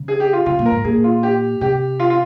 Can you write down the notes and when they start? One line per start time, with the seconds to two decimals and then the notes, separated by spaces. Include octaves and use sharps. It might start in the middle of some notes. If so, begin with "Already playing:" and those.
Already playing: C#3
0.08 G#4
0.20 G4
0.33 F4
0.46 C#3 F4
0.59 A#2
0.66 A#4
0.72 G#2
0.84 A#2 G#4
1.04 F4
1.23 G4
1.61 C3 G4
2.00 F4
2.10 F4